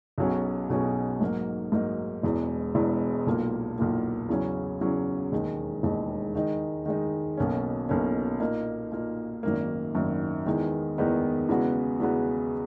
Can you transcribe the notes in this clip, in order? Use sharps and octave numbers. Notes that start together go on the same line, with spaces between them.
B1 B2 F#3 C#4 G#4
B1 B2 F#3 C#4 G#4
G#2 F#3 A#3 D#4
G#2 F#3 A#3 D#4
E1 E2 B2 G#3
E1 E2 B2 G#3
B1 A#2 A#3
B1 A#2 A#3
E2 C#3 F#3 C#4
E2 C#3 F#3 C#4
E1 D#2 D#3 G#3 D#4
E1 D#2 D#3 G#3 D#4
D#3 G#3 D#4
D#3 G#3 D#4
B1 B2 A#3 C#4
B1 B2 A#3 C#4
A#2 A#3 D#4
A#2 A#3 D#4
G#1 F#2 D#3 A#3
G#1 F#2 D#3 A#3
E2 D#3 G#3 B3 D#4
E2 D#3 G#3 B3 D#4
E2 C#3 G#3 B3 F#4
E2 C#3 G#3 B3 F#4